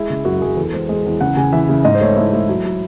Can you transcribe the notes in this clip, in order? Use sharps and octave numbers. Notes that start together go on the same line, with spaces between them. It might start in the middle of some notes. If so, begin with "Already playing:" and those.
Already playing: G#3 E4
C#3
F#2 F#4
F#2 G#4
E2 A4
G#3 C5
G#3
E2
C#3 F#5
C#3 G#5
E3 E5
C#3
G#2 D#5
C5
A3 C#5
A3 E4
A3
F#3
F#3